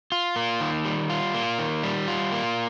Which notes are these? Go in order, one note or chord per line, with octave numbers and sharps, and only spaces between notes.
F4
A#3
D#3
G3
F4
A#3
D#3
G3
F4
A#3